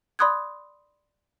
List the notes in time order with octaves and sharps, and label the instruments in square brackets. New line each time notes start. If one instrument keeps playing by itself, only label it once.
[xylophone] D5 B5 C6 D#6 F#6 G#6